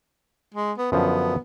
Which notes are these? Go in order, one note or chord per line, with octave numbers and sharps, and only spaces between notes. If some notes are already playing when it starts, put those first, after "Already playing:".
G#3
B3
F#2 D3 F3 B3